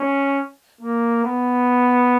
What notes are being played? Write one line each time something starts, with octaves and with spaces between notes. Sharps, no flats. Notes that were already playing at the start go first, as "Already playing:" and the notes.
Already playing: C#4
A#3
B3